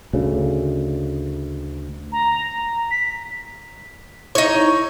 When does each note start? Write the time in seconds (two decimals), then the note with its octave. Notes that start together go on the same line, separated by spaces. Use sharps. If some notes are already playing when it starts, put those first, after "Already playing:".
0.13 D2 C#3
2.12 A#5
2.91 B6
4.35 D#4 E4 C#5